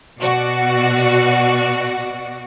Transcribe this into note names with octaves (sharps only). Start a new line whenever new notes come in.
B2 F#4 D5